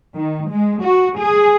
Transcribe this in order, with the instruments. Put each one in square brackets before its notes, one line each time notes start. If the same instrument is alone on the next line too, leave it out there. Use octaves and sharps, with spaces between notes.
[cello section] D#3
G#3
F#4
G#4